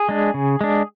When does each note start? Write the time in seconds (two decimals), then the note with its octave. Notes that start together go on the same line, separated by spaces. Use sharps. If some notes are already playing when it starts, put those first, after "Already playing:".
Already playing: G#4
0.09 G#3 D4
0.34 C#3
0.61 G#3 D4